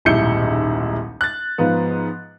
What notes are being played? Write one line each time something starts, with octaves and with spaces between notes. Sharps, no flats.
D#1 B1 G#2 E4 G6 C#7
F#6 A6
G#2 F3 B3